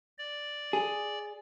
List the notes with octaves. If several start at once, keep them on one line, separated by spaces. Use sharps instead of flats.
D5
G#4